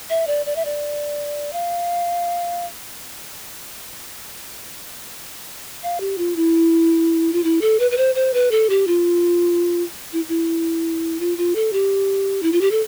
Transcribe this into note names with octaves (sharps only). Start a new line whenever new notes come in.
E5
D5
D5
E5
D5
F5
F5
G4
F4
E4
F4
E4
A4
B4
B4
C5
C5
B4
A4
G4
F4
E4
E4
F4
F4
A4
G4
E4
F4
G4
A4